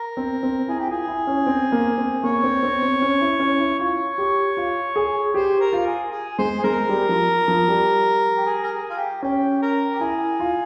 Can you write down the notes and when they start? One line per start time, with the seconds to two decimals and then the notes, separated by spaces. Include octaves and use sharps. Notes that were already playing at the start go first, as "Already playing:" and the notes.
Already playing: A#4
0.17 C4
0.43 C4
0.68 E4 G#4
0.79 G4
0.87 F4 G#4
1.08 E4
1.27 C#4
1.46 C4
1.72 A#3
1.98 C4
2.23 A#3 C#5
2.44 C4
2.63 C4
2.82 C4
3.02 C#4
3.21 E4
3.40 C#4
3.60 E4
3.79 F4 C#5
4.18 G4
4.57 F4
4.96 G#4
5.34 G4 C5
5.60 A#4
5.73 F4
5.86 G#4
6.12 G#4
6.38 G#3 C5
6.58 G#4
6.64 G#3 A#4
6.89 G3
7.09 F3
7.48 F3
7.68 G3
8.37 G4
8.46 G#4
8.63 A#4
8.71 G#4
8.90 F4
8.97 G4
9.22 C#4 G4
9.62 A#4
9.94 G4
10.00 E4 G#4
10.40 F4